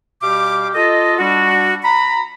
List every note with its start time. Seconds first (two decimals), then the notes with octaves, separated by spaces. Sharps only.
0.22 B2 G3 G4 F5 G5 D6
0.75 F4 A4 D#5
1.19 G3 D4 F#4
1.84 A#5 B5